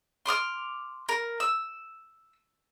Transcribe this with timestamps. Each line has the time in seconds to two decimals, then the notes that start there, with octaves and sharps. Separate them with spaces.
0.26 C6 D6 D#6 F6
1.09 A#4
1.40 E6